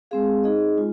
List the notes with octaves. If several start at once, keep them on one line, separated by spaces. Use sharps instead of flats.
G#3 C4 G#4 F5
D#4 G#4 D#5
G#3 F4